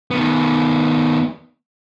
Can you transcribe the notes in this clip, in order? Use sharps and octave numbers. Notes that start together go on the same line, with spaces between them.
D#3 B3